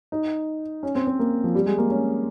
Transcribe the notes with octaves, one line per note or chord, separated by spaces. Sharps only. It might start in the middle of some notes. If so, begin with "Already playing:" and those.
D#4
C#4
C4
C4
A#3
F3
G3
G#3
A#3
C#4